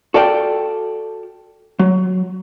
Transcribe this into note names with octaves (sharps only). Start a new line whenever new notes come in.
F#4 A4 D5 F5 G5
F#3